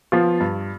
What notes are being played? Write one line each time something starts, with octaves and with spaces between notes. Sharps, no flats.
F3 B3 F4
G2